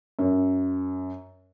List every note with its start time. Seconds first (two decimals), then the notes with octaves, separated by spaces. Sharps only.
0.19 F#2